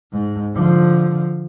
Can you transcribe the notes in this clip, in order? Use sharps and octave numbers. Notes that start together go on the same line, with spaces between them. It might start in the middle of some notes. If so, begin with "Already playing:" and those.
G#2
D3 F3